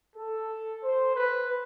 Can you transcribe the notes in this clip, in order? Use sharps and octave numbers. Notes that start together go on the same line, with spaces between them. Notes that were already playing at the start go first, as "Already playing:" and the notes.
A4
C5
B4